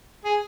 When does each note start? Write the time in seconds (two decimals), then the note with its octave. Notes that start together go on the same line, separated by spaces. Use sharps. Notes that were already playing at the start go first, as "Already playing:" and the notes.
0.25 G#4